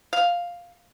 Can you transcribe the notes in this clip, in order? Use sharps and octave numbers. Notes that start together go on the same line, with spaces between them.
F5